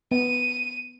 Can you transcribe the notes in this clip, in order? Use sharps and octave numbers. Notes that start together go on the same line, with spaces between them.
B3 D#7